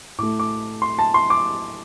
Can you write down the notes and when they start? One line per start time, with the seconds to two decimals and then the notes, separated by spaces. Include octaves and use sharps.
0.18 A2 A3 D6
0.39 D6
0.82 C6
0.99 A5
1.14 C6
1.30 D6